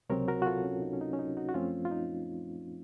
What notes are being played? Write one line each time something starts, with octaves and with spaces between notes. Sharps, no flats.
C#2 C3 F#3 C4 A#4 C#5
F#4 A#4
F#4
F4 A4
C#4
D#4
C#4
D#4
C#4
D#4
D#4 F#4
F#4
F#2 F3 A3 C4 C#4 F4
F4
D#4